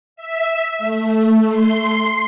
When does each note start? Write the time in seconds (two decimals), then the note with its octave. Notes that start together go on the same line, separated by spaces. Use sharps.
0.16 E5
0.78 A3
1.48 C6